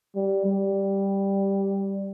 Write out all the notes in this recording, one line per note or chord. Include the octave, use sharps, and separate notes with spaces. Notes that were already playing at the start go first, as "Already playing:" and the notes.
G3
G3